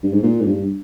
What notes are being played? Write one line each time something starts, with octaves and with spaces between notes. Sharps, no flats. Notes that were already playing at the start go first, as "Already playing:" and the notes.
G2
G#2
A#2
G#2
G2